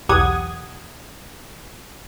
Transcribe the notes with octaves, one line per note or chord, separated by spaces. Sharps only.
B1 E2 G4 F#5 D#6 G#6